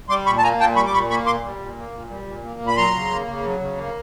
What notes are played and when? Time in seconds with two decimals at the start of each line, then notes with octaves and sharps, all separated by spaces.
0.09 G3 C6 D6
0.26 A#2 B5 C#6
0.38 A5
0.42 A#3 G#5 A#5
0.59 A#2 G5 A5
0.76 G3 B5 C#6
0.86 D6
0.93 A#2 B5 C#6
1.10 A#3 B5 C#6
1.26 A#2 C6 D6
1.44 G3
1.59 A#2
1.77 A#3
1.93 A#2
2.10 G3
2.26 A#2
2.44 A#3
2.61 A#2
2.67 B5
2.76 F#3 A#5 C6
2.94 C#3
3.10 A#3
3.27 C#3
3.44 F#3
3.60 C#3
3.77 A#3